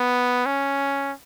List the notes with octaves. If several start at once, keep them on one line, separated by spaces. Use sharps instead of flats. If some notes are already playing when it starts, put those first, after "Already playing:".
Already playing: B3
C#4